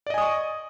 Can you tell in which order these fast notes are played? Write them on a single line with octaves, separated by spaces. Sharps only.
D5 D#5 G#5 D#6 C#6